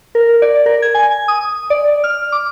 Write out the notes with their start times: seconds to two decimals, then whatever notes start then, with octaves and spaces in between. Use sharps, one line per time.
0.15 A#4
0.42 D5
0.66 A#4
0.82 G#6
0.95 G#5
1.28 D#6
1.70 D5
2.04 F6
2.32 D6